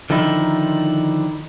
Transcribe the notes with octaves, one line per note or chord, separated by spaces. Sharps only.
D3 D#3 F3 D#4 E4